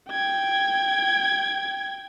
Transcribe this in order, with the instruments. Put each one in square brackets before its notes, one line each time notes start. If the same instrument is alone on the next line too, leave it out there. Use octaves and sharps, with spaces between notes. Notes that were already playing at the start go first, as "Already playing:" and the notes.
[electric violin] G5 G#6